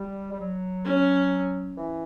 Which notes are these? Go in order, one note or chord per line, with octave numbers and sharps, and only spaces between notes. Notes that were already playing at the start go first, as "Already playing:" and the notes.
Already playing: G3
G3
F#3
C#4
E3